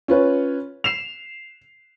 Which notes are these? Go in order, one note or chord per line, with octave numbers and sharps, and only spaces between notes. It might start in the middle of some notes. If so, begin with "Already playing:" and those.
C#4 F4 B4 C#5
C7 E7 F7